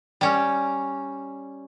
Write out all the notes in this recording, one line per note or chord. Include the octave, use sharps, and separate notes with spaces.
G3 C#4